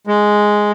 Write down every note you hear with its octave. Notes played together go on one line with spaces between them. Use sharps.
G#3